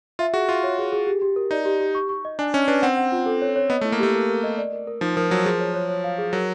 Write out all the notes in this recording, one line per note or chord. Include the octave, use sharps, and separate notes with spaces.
F4 E5
F#4 G#4
F4 E5
C#5
G#4
G#4
G4
G4
A#4
D#4 D5
G4
G4
C#6
C#6
D#5
D4 G#5
C#4 D#5
D4 B4
C4 F#5
F#5
F4
A4
C#5
C#5
B3 D#5
A3
E4
A#3
A3 G4
A#4
A#4
D#5
D5
A#4
A#4
F3 D#4
F3 A#4
F#3 A#4
F3 G#4
C#5
C#5
C#5
F5
G#4
F#3 A#4